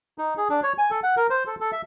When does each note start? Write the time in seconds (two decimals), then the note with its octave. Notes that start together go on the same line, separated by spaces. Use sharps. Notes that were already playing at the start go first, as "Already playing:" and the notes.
0.18 D#4
0.38 G#4
0.49 D4
0.63 C#5
0.78 G#5
0.91 A4
1.03 F#5
1.17 A#4
1.30 C5
1.47 A4
1.60 A4
1.72 E5